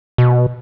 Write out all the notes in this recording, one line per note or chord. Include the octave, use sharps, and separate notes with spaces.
B2